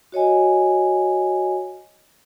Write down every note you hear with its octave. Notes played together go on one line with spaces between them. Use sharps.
F#4 C#5 D#5 G#5